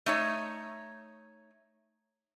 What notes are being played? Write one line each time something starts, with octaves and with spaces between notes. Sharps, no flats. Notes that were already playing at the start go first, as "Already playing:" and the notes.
A3 D#4 C#5